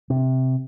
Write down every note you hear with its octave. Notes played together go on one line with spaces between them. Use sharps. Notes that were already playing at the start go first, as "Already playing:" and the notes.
C3